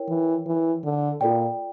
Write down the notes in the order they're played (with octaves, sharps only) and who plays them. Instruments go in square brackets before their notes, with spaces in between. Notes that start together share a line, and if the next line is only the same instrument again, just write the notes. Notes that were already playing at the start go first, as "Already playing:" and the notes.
Already playing: [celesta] E4 A#4 C#5 G5
[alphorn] E3
E3
D3
[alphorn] A#2 [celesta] F4 A4 D5 G5